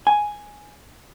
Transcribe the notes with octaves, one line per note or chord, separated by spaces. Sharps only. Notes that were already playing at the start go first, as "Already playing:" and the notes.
G#5